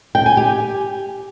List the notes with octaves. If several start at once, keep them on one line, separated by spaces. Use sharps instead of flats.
G5
G#5
G4